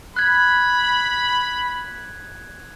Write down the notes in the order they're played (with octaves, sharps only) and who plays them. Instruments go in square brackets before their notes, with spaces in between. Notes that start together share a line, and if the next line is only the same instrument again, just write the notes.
[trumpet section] B5 [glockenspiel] F#6 G#6